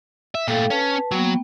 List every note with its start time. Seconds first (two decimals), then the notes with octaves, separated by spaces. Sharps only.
0.35 E5
0.48 A#2 A3 A4 F5 G5
0.70 C#4 B4 A5
1.11 F#3 A#3 B3 G5